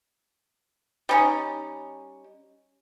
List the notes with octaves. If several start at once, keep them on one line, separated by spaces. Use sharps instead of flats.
G3 C#4 D#4